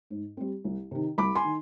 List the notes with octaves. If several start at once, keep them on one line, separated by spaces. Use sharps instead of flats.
G#2
G3 C4
C2
C3 D#3
C2 B5 D6
G#5 C6
D#3